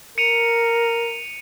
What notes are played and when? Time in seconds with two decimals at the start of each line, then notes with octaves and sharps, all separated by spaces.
0.18 A#4 C#7 D#7 F7